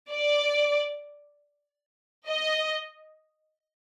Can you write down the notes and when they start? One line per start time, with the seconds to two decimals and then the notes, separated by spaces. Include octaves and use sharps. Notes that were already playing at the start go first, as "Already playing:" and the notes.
0.11 D5
2.28 D#5